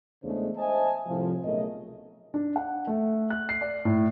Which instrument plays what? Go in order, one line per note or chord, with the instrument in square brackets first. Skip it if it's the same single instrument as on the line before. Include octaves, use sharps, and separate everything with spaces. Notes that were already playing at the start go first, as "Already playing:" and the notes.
[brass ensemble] E2 C#3 G#3 A3 D4 C5
C5 D#5 E5 G#5 A5
C2 A2 F3
B1 C#3 A3 A#4 D#5
[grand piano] D4
F#5
A3
F#6
C7
D5
A2